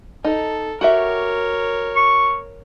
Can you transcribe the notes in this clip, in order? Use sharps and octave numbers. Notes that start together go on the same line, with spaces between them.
D#4 A4
F#4 G4 A#4 C#5 E5
C#6